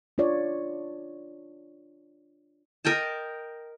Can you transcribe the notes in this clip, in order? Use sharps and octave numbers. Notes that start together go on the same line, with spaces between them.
D4 F4 C#5 D5
A#4 D#5 G5 A5